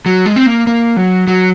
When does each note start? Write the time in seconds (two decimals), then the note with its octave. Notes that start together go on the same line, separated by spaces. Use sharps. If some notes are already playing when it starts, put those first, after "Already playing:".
0.06 F#3
0.26 G#3
0.36 C4
0.46 A#3
0.67 A#3
0.97 F#3
1.28 F#3